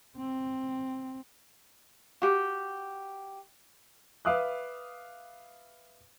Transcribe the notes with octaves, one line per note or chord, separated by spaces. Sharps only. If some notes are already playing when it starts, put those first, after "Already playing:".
C4
F#4 G4
B4 E5 F5 D6 D#6 F#6